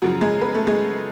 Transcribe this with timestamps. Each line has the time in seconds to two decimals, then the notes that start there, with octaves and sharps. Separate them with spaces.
0.02 F#2 C#3 F3 F#3 F#4
0.21 G#3 G#4
0.41 B3 B4
0.55 A3 A4
0.67 G#3 G#4